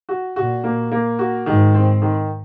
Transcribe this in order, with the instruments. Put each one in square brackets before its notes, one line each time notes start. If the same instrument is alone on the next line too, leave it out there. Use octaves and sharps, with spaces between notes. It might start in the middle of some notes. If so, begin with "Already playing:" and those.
[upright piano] F#4
[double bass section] A#2 [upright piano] F#4
[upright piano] A#3
A#3
F#4
[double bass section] G#2 [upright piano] D#3
[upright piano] C4
D#3